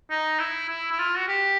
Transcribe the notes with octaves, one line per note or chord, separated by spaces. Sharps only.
D#4
E4
E4
E4
F4
F#4
G4